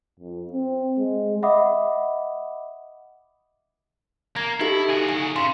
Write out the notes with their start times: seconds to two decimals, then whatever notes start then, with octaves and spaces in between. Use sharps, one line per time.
0.20 F2
0.53 C4
0.99 G#3
1.43 D#5 E5 F#5 B5 D6 D#6
4.37 A#3 G#6
4.61 D#4 E4 G4 A4
4.90 F#4 G#4
5.09 G#5
5.36 C#3 C6